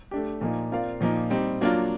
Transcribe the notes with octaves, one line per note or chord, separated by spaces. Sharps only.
A3 D4 G4
A#2 F3 A#3 D#4
C4 F4 A#4 D5 F5
A#2 F3 A#3 D#4
G3 C4 D#4
F#3 A#3 D4 F4